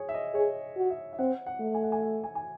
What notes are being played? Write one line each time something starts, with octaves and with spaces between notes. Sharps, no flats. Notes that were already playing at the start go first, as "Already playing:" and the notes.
Already playing: G#4 C#5
E5
D#5
G#4 C#5
F#4
E5
E5
C4 F#5
F#5
A3
G#5
F#5
G#5
E5
G#5
G#5